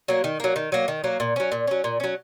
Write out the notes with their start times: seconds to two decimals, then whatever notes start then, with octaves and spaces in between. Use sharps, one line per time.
0.08 F#3 A#3
0.24 D#3
0.40 F#3 A#3
0.56 D#3
0.72 F#3 A#3
0.88 D#3
1.04 F#3 A#3
1.20 A#2
1.36 F#3 C#4
1.52 A#2
1.67 F#3 C#4
1.84 A#2
2.00 F#3 C#4